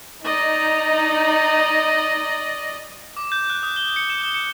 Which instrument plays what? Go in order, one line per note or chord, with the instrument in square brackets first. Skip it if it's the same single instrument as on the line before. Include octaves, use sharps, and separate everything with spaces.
[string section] D#4 [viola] D5 D#5
[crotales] D6
G6
F#6
D#6
G7
C#7
E7
G7
C#7